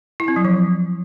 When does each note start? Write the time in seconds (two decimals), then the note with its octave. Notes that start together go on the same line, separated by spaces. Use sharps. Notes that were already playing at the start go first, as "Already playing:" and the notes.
0.20 E4
0.28 C4
0.36 F#3
0.45 F3